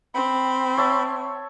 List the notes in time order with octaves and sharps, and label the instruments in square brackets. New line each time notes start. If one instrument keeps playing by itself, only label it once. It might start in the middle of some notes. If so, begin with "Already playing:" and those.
[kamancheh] C4 [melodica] B5
[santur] C#5 E5 A5